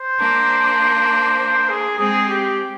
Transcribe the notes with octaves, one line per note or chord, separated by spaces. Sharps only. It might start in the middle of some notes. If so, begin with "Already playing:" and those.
Already playing: C5
A#3 D4
C5
G#4
G#3 C4 G#4
G4